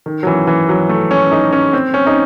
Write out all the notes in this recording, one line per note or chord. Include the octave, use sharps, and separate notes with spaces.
D#3
F#3
E3
E3
F#3
A3
C#4
D#4
C#4
C4
C#4
D#4